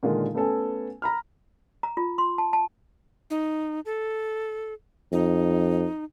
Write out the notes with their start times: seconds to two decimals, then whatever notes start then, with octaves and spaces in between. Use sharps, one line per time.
0.03 A#2 D3 D#3 G#3 F4
0.34 A3 B3 C#4 A4 G#5
1.02 A#5 B5 F6
1.83 A#5
1.97 F4
2.18 C6
2.38 A5
2.53 A5
3.30 D#4
3.86 A4
5.13 F2 D#4